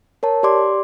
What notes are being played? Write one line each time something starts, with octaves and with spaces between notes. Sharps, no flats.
A#4 C#5 A5
G4 D5 C6 D6